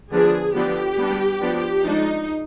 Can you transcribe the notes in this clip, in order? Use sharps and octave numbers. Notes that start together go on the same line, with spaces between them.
D3 F3 B3 D4 G#4
D3 F3 B3 D4 G4
G3 B3 D4
F3 B3 D4
F3 G#3 D4 D#4